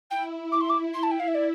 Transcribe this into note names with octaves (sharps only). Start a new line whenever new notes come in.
E4 G5
D6
C6
D6
C6
A5
G5
F5
E5
D5